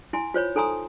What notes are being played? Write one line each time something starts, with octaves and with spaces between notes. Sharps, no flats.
E4 G#5 C6
F4 C5 C#5 B5
D#4 A4 G#5 A#5 C6 D#6